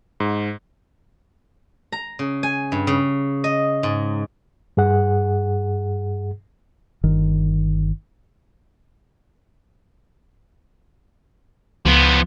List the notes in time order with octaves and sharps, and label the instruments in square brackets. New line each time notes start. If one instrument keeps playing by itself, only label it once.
[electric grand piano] G#2
[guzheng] A#5
C#3
G#5
G2
C#3
D#5
G#2
[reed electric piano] G2 G#4 F#5
[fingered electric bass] G1 D#3
[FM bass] C#2 [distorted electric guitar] F3 B3